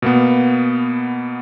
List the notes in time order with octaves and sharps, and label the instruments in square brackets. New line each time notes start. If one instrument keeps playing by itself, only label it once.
[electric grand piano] B2 A#3 B3